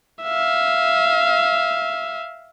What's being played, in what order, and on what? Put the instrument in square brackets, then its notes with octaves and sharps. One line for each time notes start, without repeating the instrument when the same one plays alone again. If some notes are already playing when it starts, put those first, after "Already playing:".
[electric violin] E5 F5